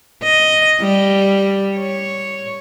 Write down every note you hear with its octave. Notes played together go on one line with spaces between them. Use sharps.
D#5
G3
C#5